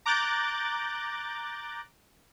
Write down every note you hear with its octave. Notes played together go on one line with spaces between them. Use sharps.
A#5 D6 F#6 G6 A6